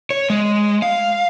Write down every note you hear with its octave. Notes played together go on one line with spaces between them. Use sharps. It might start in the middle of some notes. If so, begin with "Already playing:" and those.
C#5
G#3
F5